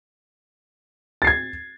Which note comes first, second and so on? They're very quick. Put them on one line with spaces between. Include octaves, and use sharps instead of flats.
A6 C7 G#6